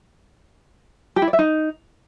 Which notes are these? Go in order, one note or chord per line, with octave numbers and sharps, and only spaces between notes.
G4
E4
D5
E5
D#4